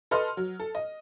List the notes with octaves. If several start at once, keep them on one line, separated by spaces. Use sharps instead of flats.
A4 B4 D#5 C6 F6
F#3
A4
D#5